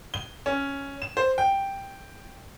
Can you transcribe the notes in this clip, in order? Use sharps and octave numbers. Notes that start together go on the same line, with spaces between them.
G7
C#4
E7
C5
G5